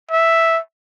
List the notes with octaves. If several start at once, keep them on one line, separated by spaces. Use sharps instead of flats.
E5